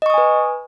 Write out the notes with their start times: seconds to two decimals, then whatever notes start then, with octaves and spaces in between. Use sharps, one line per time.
0.02 D#5
0.06 C#6
0.10 D#6
0.14 G#5
0.18 B4